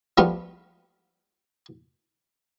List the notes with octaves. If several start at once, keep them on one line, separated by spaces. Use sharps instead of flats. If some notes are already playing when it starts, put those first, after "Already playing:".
F3 G3 A3 B3 F4